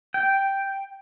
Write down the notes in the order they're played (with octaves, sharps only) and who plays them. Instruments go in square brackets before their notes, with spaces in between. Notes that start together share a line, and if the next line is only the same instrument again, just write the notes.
[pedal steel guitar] G5